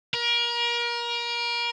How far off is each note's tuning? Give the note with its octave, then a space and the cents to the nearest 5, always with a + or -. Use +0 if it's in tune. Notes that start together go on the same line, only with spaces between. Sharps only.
A#4 +30